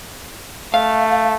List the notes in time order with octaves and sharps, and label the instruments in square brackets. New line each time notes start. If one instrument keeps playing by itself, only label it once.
[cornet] A3 [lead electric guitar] F5